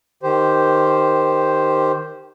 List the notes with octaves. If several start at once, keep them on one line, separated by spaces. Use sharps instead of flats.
D#3 G4 C5